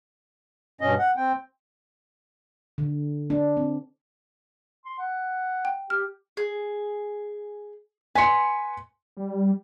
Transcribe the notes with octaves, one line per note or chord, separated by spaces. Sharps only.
G2 B2 C#4 D#5
F#5
C4 G5
D3
D4
C4
C6
F#5
G5
G4 F6
G#4
B4 G#5 C6 C#7
G3